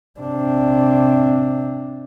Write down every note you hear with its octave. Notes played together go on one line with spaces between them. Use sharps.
C3 D4